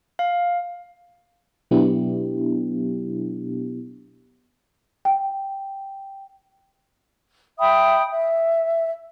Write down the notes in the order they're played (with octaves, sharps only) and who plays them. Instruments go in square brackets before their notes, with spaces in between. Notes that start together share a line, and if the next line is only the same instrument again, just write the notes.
[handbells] F5
[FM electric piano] B2 F#3 B3 D4 E4 G4
[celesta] G5
[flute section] E5 G5 B5 D#6
E5